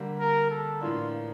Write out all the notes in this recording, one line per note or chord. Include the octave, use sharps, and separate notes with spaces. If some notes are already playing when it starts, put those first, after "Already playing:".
Already playing: D3 G3 A#3
A#4
A4
A2 E3 A#3 D4 F4